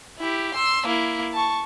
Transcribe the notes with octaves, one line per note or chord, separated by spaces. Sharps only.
E4 G4
C6 E6
A#3 E4
A5 C#6